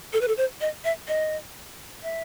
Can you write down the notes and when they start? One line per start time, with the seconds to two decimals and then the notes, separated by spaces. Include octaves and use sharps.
0.13 A4
0.21 B4
0.28 A4
0.37 C5
0.61 D#5
0.84 E5
1.08 D#5
2.03 E5